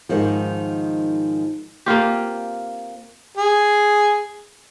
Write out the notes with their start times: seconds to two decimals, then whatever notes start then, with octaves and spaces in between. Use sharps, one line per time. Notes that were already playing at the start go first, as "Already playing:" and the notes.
0.09 G#2 D#3 F3
1.86 A#3 C4 F4 G4
3.38 G#4